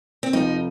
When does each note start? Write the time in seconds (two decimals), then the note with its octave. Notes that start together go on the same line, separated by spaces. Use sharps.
0.23 C4
0.33 F1 F2 F3 D#4